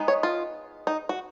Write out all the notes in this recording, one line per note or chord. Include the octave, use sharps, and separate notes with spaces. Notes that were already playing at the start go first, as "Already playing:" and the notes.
Already playing: G#3 B3 D#4
C#5
F4
D#4
F#4